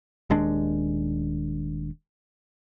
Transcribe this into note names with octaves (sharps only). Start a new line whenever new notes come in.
D#1 D#2 G#3 D4